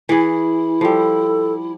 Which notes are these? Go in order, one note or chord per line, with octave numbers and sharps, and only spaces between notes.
E3 E4 G#4
F3 G3 A4